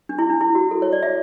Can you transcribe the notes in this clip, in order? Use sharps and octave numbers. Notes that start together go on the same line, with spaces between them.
D4
E4
D4
E4
F#4
A4
C#5
D5
E5